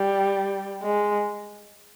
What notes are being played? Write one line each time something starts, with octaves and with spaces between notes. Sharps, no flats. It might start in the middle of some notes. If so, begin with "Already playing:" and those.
Already playing: G3
G#3